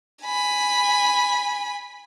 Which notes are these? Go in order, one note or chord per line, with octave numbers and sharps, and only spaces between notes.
G#5 B5